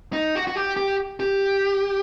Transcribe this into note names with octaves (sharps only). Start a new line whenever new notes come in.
D#4
F#4
F#4
G4
G4
G4